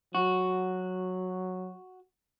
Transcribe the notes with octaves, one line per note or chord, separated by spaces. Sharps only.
F#3 F#4